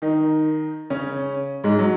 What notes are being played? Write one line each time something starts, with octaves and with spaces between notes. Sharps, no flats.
D#3 D#4
C#3 C#4
G#2 G#3
F#3